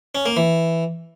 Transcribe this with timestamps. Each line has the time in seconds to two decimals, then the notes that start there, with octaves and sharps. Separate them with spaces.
0.15 C#4
0.26 A#3
0.37 E3